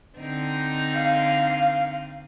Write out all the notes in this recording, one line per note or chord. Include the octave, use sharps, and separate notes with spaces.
D3 C4 D#4
F5